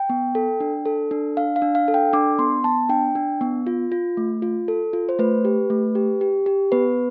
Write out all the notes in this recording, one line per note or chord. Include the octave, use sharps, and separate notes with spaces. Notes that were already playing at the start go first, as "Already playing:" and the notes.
Already playing: G5
B3
A4
D4
A4
D4
D4 F5
F5
D4
F5
A4
G5
D4 D6
B3 C6
B3 A5
D4 G5
D4
B3
F4
F4
A3
F4
A4
F4
C5
A3 B4
G4
A3
G4
G4
G4
B3 B4